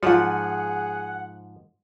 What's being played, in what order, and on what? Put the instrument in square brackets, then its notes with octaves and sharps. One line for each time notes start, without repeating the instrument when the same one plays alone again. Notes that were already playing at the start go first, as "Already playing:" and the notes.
[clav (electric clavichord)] G#2 F3 [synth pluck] F#3 F4 [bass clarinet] G#4 [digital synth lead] F#5